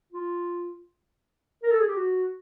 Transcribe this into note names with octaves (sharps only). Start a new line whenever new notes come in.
F4
A#4
A4
G#4
G4
F#4